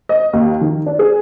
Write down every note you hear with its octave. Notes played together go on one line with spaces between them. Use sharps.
D#5
D#2
D#3
D4
G#4